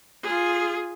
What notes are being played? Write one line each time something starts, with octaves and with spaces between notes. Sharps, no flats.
F4 G#4